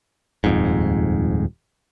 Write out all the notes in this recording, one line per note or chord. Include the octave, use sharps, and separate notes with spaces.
D#1 F2 G#2